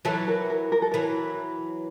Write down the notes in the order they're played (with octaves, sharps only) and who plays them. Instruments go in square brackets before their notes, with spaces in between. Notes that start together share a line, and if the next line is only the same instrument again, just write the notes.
[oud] E3 F#3 [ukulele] A4
[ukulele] A#4
A#4
A#4
A4
[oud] E3 F#3 [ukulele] A#4